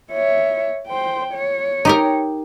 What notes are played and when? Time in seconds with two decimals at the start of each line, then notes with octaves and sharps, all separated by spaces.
0.12 C#5 E5
0.87 C5 G5
1.34 C#5
1.85 D#4 G4 A#4